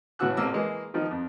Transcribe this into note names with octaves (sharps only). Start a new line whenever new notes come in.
A2 C#3 E3 F#4 E6 F#6
A1 C3 A#3 A#4 E6
E3 G#3 A#3
D#3 F3 D#4
F2